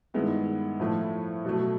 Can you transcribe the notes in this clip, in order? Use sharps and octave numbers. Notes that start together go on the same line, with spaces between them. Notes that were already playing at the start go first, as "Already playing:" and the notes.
G2 D#3 G#3 B3 E4
A2 F3 A3
B2 F#3 A3